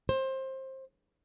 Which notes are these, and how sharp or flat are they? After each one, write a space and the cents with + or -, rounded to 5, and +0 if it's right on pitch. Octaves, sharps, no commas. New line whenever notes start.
C5 +20